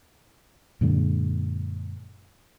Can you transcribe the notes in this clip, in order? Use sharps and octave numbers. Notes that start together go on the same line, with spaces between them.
F#2 A#2 D3 G#3